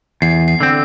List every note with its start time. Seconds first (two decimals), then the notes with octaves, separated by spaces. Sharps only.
0.22 E2 C7
0.48 C7
0.61 D3 C4